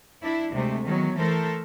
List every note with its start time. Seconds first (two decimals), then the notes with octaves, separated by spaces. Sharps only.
0.22 D4 E4
0.52 D2 C3 G#3 A3
0.85 D#3 E3 F#3 B3
1.15 E3 A3 A4 A#4 C5